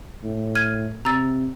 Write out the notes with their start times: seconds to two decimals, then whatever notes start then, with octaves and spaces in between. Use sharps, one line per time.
0.24 A2
0.55 F6 G#6 D#7
1.05 C3 A#5 E6 A6